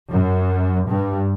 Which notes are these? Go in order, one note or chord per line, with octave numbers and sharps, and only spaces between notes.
F#2
G2